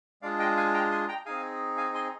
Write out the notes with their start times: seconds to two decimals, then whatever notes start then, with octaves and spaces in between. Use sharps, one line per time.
0.22 G#3 D4 F4 G#4 D5 F5
0.39 D#5 G5
0.57 F5 G#5
0.74 G5 A#5
0.91 G#5 C6
1.08 G5 A#5
1.26 C4 D#4 G#4 F5 G#5
1.77 F5 G#5
1.94 G#5 C6